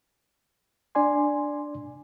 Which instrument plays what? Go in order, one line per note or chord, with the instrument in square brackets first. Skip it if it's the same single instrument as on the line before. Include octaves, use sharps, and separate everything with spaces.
[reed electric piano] D4 D5 G#5 C6